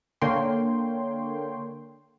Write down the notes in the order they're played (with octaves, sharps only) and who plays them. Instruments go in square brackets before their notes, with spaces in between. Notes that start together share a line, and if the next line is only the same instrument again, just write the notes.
[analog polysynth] D3 A#3 C#5 G5 C6